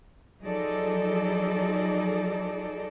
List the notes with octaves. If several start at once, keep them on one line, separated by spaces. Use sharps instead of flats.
F3 F#3 D#4 G#4 A4 D5